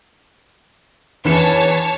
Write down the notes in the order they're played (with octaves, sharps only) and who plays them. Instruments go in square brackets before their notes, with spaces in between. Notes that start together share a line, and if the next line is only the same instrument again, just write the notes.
[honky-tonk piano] E2 E3 E7 [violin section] C#5 A5